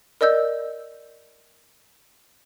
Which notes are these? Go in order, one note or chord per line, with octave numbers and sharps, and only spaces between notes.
A#4 D5 D#5 E6 G6